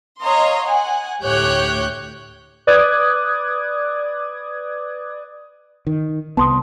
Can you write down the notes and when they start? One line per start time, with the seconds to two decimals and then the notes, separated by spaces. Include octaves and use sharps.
0.20 C#5 D#5 F5 A#5 C6
0.63 F#5 G#5
1.23 D2 A2 G4 C#5 F#6 G6
2.67 B4 D5 D6 D#6 F#6 G#6
5.87 D#3
6.37 C2 B3 A5 C6 D#6